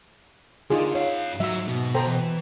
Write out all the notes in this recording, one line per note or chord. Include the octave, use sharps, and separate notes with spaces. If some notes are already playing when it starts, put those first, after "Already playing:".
D3 D4 D#4 F4 G#4
F#2 C#5 F5
G#2 F#3 E5 E6
B2
D2 A4 C5 G5 A#5
E3